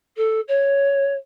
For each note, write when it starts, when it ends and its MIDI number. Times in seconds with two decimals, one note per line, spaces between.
0.16 0.40 69
0.48 1.13 73